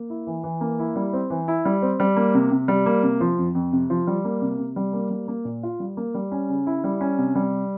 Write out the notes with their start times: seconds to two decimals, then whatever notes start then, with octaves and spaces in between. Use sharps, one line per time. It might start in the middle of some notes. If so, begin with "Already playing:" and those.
Already playing: A#3
0.10 E4
0.27 E3
0.44 E3
0.61 A#3
0.79 E4
0.96 G3
1.13 C4
1.30 E3
1.48 E4
1.65 G3
1.82 C4
2.00 G3
2.17 A#3
2.34 C3
2.51 C3
2.68 G3
2.86 A#3
3.03 C3
3.20 F3
3.38 F2
3.55 F2
3.72 C3
3.90 F3
4.07 G3
4.25 A#3
4.42 C3
4.59 C3
4.76 G3
4.93 A#3
5.11 G3
5.28 A#3
5.45 A#2
5.63 F4
5.80 G3
5.97 A#3
6.14 G3
6.32 C#4
6.49 C#3
6.67 E4
6.84 G3
7.01 C#4
7.18 C3
7.35 G3